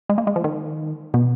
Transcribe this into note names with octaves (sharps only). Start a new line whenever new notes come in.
G#3
A#3
G#3
F3
D#3
B2